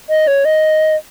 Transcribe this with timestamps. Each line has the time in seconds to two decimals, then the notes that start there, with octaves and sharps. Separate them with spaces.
0.10 D#5
0.27 C#5
0.45 D#5